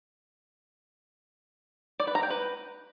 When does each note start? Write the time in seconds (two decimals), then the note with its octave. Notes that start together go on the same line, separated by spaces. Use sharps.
2.00 D5
2.07 B4
2.15 A#5
2.23 G5
2.30 B4